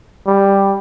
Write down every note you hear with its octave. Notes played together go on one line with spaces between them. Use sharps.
G3